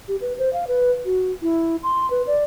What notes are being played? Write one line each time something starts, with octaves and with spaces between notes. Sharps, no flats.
G4
B4
C5
F5
B4
F#4
E4
C6
B4
D5